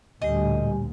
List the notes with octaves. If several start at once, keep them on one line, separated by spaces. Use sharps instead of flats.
A1 D2 A#2 G3 G4 D#5 G#5